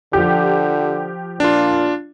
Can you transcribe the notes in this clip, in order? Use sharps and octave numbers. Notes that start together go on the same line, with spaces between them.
D3 F3 G4
A#2 D4 F4